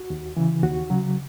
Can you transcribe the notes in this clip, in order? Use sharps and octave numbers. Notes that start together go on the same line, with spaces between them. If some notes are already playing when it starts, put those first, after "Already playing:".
Already playing: F#4
D#2
C#3 E3
D#2 F#4
C#3 F#3